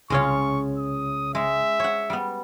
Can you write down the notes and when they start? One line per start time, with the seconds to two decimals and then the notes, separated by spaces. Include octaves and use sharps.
0.10 C2 C#3 G#3 C#4 F4 C#5 C#6
0.77 D#6
1.35 G#3 E5
1.80 C#5 F#5
2.10 G3 B3